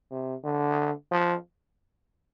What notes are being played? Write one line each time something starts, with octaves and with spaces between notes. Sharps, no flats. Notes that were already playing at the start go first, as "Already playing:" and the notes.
C3
D3
F3